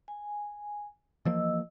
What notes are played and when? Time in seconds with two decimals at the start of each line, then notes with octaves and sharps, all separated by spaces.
0.08 G#5
1.25 E3 F3 A#3 D#5 E6